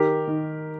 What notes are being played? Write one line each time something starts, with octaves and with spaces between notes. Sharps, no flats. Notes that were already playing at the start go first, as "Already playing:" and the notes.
Already playing: D#3 G4 A#4
D#3